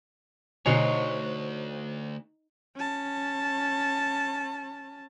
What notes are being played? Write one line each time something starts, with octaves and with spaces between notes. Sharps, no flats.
D2 B2 D3 D#4 F#4 C5 C#5 G#5
C#4 A5